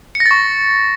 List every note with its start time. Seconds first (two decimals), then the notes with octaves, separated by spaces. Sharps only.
0.15 C#7
0.20 A#6
0.26 A6
0.31 C#6